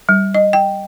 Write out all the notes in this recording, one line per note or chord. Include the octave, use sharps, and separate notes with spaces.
G3
D#5
G5